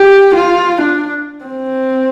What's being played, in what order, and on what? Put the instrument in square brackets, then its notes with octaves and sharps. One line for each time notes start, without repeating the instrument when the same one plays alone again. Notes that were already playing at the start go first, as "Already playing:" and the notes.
Already playing: [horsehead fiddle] G4
F4
D4
C4